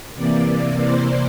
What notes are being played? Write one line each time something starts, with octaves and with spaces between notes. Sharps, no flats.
C3 E3 A#3 D5
C5